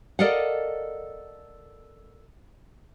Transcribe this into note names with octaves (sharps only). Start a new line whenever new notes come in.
A4 A#4 D5 D#5 F5 F#5